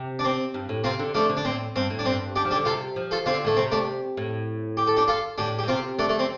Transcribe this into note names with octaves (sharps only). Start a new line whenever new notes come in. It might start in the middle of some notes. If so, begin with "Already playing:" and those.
Already playing: C3
D4
C4
G2
A2
C3 C4 F4
D3
F3 A3 D4
D3
D4
A2 C4
G2 C4
A2
D4
G2 C4
D4 G4
F3
D4 G4
D3
C3 F4 A4
F3
F4 A4
D3 C4 F4
A2 A3
C3 C4
A3 D4
A2
G4
A4
D4 G4
F4 A4
A2 D4 G4
A2 G4
C3 C4 F4
D3 A3 D4
A3
C4